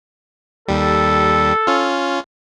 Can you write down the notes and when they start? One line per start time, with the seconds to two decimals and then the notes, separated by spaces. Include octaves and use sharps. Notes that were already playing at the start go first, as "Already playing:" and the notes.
0.68 D#2 G3 A4
1.67 C#4 F4